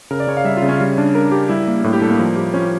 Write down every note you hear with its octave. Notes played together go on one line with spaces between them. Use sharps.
C#3 A#4
D5
C#3 C#5
F5
G3 E5
F4
C#3
C#4
G3
D4
A#4
G4
G3 E4
A#3
A2
G4
G3 A4
A#3
F3
G4
F3 C#4